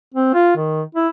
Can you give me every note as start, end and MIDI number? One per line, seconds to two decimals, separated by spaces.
0.14 0.31 60
0.34 0.54 65
0.56 0.82 51
0.95 1.08 64